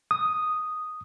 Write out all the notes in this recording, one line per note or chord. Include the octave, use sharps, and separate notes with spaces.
D#6